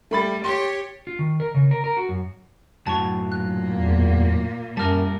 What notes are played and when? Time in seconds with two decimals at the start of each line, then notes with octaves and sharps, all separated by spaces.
0.11 G3 A3 B5 A6
0.44 G4 C#5 C6
1.07 F4
1.19 D#3
1.40 A#4
1.54 C#3
1.71 A#4
1.84 A#4
1.97 F#4
2.09 F#2
2.87 F#2 A2 F#3 A5 C#6
3.32 A#2 A#3 F#6
3.72 E2
4.77 F#2 G3 A#4 A5 F6